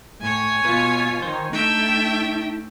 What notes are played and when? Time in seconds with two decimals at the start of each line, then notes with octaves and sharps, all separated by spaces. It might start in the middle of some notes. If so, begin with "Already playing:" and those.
0.21 A2 C#5 G#5
0.65 B2 B3 F4 B4
1.22 D#3 C5
1.53 A3 D4 D#4 E5 G5